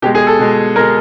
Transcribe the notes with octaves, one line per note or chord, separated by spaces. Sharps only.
B2 G#3 G4
G#4
A4
B2 G#3
B2 G#3 A#4